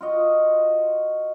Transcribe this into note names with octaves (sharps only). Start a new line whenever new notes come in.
F4 F#4 D#5